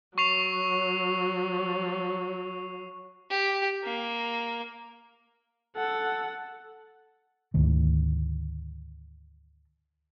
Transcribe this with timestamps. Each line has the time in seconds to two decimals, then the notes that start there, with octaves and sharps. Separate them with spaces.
0.18 F#3 C#6 C7 F7
3.30 G4
3.84 A#3
5.76 A4 F#5
7.54 D2 G#2 D#3 A3